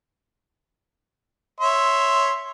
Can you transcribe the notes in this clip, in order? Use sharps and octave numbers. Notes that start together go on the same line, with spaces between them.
C#5 E5 C6